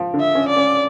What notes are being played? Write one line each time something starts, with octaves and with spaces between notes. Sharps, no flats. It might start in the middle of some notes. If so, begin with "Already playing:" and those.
Already playing: F3
D3
E5
C#4
D5
C#4